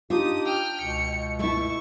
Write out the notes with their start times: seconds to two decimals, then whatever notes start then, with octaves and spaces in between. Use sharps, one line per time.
0.10 D4 D#4 F4 G4 D#6
0.46 G5 F6
0.81 C#2 B2 C#7
1.39 A3 E4 A5 C#6